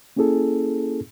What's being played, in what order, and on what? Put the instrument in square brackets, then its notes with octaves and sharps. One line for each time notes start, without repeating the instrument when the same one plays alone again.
[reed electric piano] A#3 C#4 E4 G#4 A4